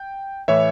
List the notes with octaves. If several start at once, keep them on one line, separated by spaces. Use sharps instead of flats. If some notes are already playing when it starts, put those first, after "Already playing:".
Already playing: G5
A2 E3 C#5 E5